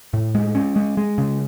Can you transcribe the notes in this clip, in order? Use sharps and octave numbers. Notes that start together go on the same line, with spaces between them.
A2
G#3
C#4
G#3
G#3
C#3